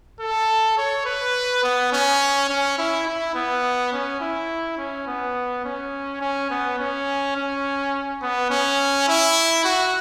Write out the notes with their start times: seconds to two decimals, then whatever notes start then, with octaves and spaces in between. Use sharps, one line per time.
0.20 A4
0.78 C#5
1.06 B4
1.64 B3
1.93 C#4
2.49 C#4
2.78 E4
3.07 E4
3.35 B3
3.93 C#4
4.21 E4
4.78 C#4
5.07 B3
5.65 C#4
6.21 C#4
6.51 B3
6.79 C#4
7.36 C#4
8.22 B3
8.51 C#4
9.08 E4
9.65 F#4